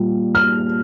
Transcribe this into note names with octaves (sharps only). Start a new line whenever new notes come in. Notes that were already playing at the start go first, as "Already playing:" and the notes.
Already playing: A#2 G3
F6